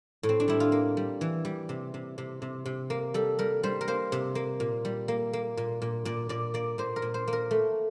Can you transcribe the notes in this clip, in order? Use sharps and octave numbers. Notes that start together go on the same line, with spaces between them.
A2
C4
D4
G3 E4
F4
A#3
G3
E3
G3
C3
C3
C3
C3
C3
A#3
G3 A4
G3 A#4
G3 C5
A#4
A#3 C5
C3
A#3
A#2
G3
A#3
A#3
A#2
A#2
A#2 D5
A#2 D5
A#3 D5
A#2 C5
A#4
A#2
C5
A#3
A#4
A3